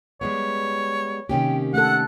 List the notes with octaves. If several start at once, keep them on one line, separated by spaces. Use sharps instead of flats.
G3 G#3 B3 C#5
C3 D#3 A#3 C#4 G4 G5
A3 A4 F#5 F#6